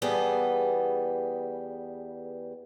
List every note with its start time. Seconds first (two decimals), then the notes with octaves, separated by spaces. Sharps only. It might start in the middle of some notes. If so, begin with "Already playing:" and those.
0.02 E2 G3 B3 G#4 A4